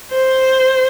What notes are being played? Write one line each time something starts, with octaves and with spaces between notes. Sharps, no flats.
C5